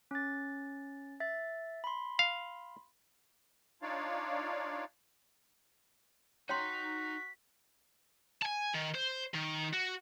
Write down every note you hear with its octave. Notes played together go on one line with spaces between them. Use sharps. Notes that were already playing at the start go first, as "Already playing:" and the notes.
C#4 A6
E5 A6
B5 C6
F5
D4 D#4 F4 C#5 D5 F5
D#4 F#4 C#5 G5 A#5 C6 B6
G#5 A5
D#3
C5
D#3
F#4